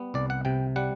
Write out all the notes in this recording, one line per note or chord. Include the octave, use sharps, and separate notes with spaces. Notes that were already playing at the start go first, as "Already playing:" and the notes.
Already playing: G3 B3
C2 D5
F#5
C3 G5
G3 F#5